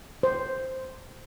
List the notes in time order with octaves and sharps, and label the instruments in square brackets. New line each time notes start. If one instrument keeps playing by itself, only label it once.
[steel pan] C5